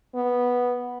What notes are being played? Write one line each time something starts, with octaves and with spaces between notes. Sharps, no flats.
B3